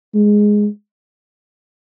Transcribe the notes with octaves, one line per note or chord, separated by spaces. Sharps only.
G#3